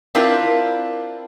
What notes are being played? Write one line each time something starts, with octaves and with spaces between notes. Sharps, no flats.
C4 D4 E4 F4 A#4 B4